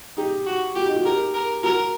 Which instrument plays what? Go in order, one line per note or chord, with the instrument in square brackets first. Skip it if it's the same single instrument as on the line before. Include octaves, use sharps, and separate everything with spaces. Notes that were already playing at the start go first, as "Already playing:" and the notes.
[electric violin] D#4 [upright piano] G4
[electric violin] F#4
[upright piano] F#4 [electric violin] G4
[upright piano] D#4
F#4
[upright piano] G4 [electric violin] A#4
[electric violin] A#4
[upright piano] F#4 [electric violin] A#4